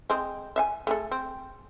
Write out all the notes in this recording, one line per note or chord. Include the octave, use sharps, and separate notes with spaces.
G#3 C4
E5 F5 G#5
A3 G#4 A4
C4